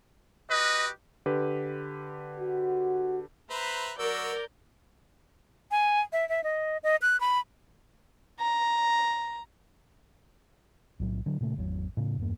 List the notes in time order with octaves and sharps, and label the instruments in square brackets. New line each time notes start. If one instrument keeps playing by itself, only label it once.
[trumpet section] F#4 G4 B4 [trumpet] D#5
[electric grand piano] D3 G4 B4
[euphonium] F#4
[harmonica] B4 C5 E5 [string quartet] A#5 B5 F#6
[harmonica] F#3 F#4 E6 [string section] A#4 [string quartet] D5 D6 G6
[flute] G#5
E5
E5
D#5
D#5
F#6
B5
[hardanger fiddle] A#5
[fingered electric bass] B1 A2 F#3
D3 F#3
A#2 C#3 A3
G#1 E2 B2 F#3
A2 C#3
E2 G2 A#3